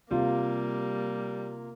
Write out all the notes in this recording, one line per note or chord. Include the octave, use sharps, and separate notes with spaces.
C3 G3 A#3 F4